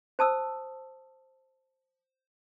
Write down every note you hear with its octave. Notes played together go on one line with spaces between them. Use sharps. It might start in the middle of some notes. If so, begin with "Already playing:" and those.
C5 A5 D#6 E6